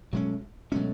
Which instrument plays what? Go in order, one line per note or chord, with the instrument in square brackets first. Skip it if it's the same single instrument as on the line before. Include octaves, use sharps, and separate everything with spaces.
[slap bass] B2 G#3 C#4 [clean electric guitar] F#3 A3
[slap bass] B2 G#3 C#4 [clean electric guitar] F#3 A3